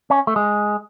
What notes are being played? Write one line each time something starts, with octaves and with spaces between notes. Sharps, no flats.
C#4
A3
G#3